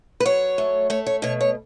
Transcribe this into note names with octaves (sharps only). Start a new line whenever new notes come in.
B4
F#3 C#5
A3
A3 C#5
C#5
B2 C#5
C#5